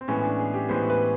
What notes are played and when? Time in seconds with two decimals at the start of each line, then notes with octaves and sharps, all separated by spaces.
0.01 C4
0.08 A2 E3 G#3 B3 C#4
0.24 D4
0.39 G#4
0.54 G4
0.69 A2 E3 G#3 B3 C5
0.90 B4